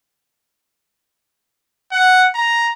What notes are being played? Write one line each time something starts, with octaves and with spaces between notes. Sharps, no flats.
F#5
A#5